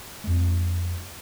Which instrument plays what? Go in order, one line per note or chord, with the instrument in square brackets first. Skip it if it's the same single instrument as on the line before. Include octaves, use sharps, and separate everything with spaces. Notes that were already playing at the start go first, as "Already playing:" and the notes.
[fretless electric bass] F2 G#3